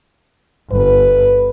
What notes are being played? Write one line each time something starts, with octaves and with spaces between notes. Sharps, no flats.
G1 B4